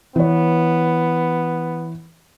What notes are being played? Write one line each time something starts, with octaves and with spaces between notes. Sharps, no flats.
E3 B3 C#5